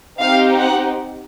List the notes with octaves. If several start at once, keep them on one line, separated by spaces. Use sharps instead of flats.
C4 D#4 G4 F5
F#5